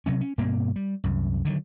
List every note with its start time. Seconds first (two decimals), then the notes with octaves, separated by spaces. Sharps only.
0.06 C3 F#3 C#4
0.21 C#4
0.38 G2 B2 A#3 C4
0.76 G3
1.04 C2 F#2
1.45 D3 D#3 F3 F#3